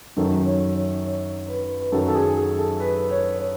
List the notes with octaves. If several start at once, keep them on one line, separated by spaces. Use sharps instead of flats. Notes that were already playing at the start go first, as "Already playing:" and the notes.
F#2 D#3 F#3 A4
C#5
C#5
C#5
B4
B4
F#2 D#3 F#3 A4
A4
G#4
G#4
A4
B4
C#5
C#5